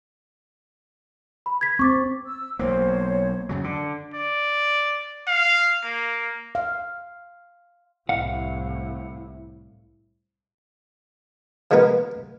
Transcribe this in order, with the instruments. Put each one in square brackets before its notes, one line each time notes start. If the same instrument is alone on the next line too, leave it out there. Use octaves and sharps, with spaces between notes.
[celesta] B5
G#6 B6
[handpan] C4 [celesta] C#6 D6 A6
[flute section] E6
[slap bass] B1 A#3 [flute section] C5 C#5
[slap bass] F#2 C#3 F#3
[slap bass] D3 [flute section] D4
[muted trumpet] D5
F5
A#3
[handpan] F5
[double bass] C2 A2 [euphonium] E4 [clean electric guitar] F5 F#5
[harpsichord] F3 G#3 B3 A#4 B4